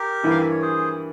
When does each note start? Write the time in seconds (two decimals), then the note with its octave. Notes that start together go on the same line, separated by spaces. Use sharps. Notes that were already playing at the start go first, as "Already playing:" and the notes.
Already playing: G4 A#4
0.23 G2 E3 A#3 E4
0.31 F5
0.41 E5
0.51 C#5
0.62 G#4 C5